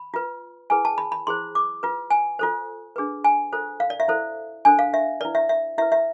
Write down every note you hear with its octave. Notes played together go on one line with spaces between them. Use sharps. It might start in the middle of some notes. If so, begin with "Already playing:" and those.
Already playing: B5
F4 B4
E4 G#4 B4 G#5
A5
B5
B5
E4 G#4 C5 C6
D6
F4 B4
G#5
F4 A4 C5
D4 G#4 B4
G#5
F4 A4 C5
F5
D5
E5
E4 A4 C5
D4 A4 C5 G#5
F5
E5
E4 B4 D5
E5
E5
E4 B4 E5
E5